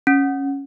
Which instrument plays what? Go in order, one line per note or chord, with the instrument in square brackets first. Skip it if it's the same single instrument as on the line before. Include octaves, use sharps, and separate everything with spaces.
[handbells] C#4